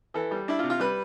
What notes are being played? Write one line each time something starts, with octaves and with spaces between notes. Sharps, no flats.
E3 A4
G3
D4 E4
F4
C3
F4
G3 B4